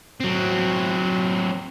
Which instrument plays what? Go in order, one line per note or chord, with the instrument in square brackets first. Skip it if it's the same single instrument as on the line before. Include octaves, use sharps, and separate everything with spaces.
[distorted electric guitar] F#3 C4